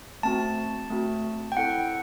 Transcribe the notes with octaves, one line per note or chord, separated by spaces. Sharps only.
A3 C4 F#4 A5
A3 C4 F#4
G5
C4 E4 A4 F#5